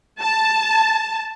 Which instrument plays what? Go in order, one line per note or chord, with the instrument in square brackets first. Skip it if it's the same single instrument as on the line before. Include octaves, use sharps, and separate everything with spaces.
[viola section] A5